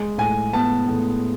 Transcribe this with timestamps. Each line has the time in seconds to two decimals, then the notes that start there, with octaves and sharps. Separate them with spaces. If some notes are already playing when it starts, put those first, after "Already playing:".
Already playing: G#3
0.18 A2 G#5
0.53 B3 A5
0.88 A2